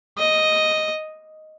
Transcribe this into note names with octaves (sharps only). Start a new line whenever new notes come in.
D#5